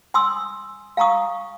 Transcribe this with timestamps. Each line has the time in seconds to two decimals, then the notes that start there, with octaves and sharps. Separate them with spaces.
0.14 G#5 C6 D#6 E6
0.97 F5 G#5 A#5 C#6 D#6